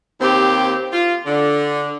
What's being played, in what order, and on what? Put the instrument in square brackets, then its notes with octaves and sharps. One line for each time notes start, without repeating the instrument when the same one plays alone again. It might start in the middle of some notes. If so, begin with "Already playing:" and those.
[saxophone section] D#2 C4 G4
F4
D3